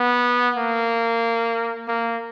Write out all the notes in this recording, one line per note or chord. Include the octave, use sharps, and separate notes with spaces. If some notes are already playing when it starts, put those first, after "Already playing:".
Already playing: B3
A#3
A#3